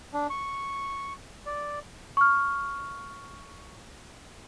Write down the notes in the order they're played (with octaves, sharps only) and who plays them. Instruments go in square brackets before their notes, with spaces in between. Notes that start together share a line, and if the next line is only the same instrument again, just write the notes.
[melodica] D4
C#6
D5
[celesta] C#6 F6